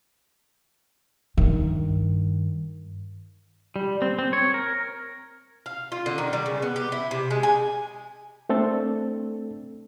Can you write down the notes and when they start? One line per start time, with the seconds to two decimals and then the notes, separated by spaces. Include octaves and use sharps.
1.37 G2 D#3
3.76 G3
4.02 C4
4.19 C4
4.33 C#5
4.54 A#4
5.66 F5
5.92 F4
6.06 D3
6.18 D#3
6.33 G3
6.46 C#3
6.62 B3
6.76 G4
6.92 E4
7.11 C3
7.31 G#3
7.43 G#5
8.49 A3 C4 D4 A4